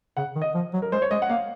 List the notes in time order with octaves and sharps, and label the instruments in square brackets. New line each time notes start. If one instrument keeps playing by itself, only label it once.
[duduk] C#3 [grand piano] F#5
[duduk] D#3
[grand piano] D#5
[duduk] F3
F#3
[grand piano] A#4
[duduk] G#3 [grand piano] C5
[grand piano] C#5
[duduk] G#3 [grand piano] D#5
[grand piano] F#5
[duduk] A#3 [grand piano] F5